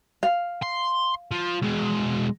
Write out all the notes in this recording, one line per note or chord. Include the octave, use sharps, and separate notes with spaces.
F5
C6
F3
B2 G#3